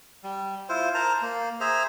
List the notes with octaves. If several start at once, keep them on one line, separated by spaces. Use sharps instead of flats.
G3
E4 F4 C5
A#4 C5 A5 A#5
A#3
G#4 C5 E5 A#5